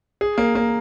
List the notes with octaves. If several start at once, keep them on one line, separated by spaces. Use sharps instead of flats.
G#4
A#3
A#3